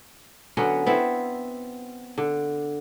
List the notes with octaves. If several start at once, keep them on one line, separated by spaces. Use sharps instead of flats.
D3 F#3 B3 C#4
B3 C4 E4
D3